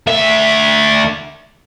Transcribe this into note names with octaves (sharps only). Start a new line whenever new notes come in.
D2 E5